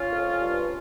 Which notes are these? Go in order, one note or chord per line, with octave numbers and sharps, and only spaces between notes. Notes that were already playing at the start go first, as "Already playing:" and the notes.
Already playing: C#4 F4
F2
G2